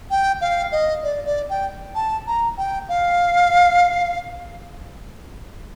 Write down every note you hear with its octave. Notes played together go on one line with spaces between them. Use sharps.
G5
F5
D#5
D5
D5
G5
A5
A#5
G5
F5